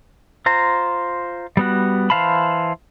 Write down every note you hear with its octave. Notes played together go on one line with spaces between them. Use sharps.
F4 C5 A#5
G3 B3 F#4
E3 C5 F5 A5 B5